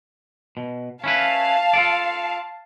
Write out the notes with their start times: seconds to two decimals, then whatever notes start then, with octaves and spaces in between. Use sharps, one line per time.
0.57 B2
1.04 C#4 E4 B4 F5 A5
1.73 F4 A4 D5